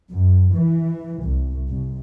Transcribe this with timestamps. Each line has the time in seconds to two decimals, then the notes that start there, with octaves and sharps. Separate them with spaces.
0.10 F#2
0.54 E3
1.23 C2
1.69 C2